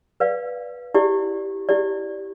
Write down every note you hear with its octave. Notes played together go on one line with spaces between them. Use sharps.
B4 D5 F5
E4 G4 D5
E4 G4 D5